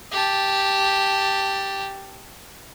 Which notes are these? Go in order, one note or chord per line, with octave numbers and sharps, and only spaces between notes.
G4 A5